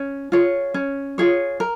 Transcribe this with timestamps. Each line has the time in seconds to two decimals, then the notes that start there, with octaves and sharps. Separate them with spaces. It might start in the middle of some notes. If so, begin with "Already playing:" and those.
Already playing: C#4
0.32 F4 G#4 C#5
0.74 C#4
1.18 F4 G#4 C#5
1.60 A#4